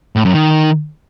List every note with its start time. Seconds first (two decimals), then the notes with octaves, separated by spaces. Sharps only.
0.16 A2
0.25 F#2
0.34 D#3